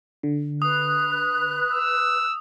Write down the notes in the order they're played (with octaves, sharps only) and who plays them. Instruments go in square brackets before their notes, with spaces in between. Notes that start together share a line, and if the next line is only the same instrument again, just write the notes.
[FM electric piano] D3
[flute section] B4 F#6 [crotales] D#6
[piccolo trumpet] E6